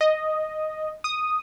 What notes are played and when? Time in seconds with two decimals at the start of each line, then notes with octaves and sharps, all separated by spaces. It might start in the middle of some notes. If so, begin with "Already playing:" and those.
0.01 D#5
1.04 D#6